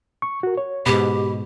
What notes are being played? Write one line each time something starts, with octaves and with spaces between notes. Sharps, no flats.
C#6
F#4 A#4
C#5
G#2 B2 G4 B5